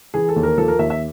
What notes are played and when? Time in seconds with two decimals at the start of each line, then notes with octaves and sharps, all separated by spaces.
0.14 E3 G#4
0.29 A4
0.36 D#2
0.43 A#4
0.58 F3 A4
0.68 A#4
0.79 D#2 E5
0.90 E5